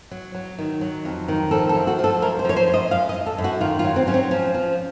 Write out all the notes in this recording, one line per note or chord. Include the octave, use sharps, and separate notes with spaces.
F#3
F#3
D#3
F#3
F2
D#3
F3 A4
A4
F#2
F#4
F3
A4
F#2 A#4
C5
F3 C#5
C5
F#2
D#5
F#2 F5
D#5
F#2
A4
F#2
F#4
D#3 F4
F4
F#3
C4
F#3 C#4
C4
F3 C#4
F3